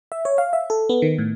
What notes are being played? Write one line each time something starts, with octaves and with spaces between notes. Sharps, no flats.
E5
C#5
F5
E5
A4
B3
D#3
A2